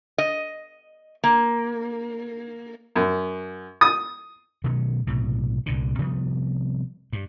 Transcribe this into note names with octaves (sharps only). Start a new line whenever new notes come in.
D#5
A#3
F#2
D#6
B2 D#3 F#3 A3
B1 A2 C3
C2 A#2 D3
C3 F3 G3 B3
G2